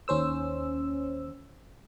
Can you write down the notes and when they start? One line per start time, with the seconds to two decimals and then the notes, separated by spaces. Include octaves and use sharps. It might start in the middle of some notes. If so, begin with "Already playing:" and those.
0.08 D#2 C#4 C5 E6